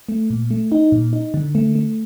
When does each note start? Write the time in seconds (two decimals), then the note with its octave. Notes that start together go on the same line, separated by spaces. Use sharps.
0.09 A3
0.30 A#2
0.51 A3
0.72 D#4
0.92 A#2
1.13 D#4
1.34 D3
1.55 A3
1.75 A3